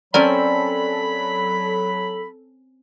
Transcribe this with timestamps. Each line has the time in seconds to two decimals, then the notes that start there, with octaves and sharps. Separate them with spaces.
0.14 F#3 C4 C#4 A4 A#4 D5 B5